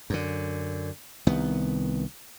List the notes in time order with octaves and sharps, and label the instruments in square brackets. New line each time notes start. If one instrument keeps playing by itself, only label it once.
[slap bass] F#2 D3
C2 D#3 B3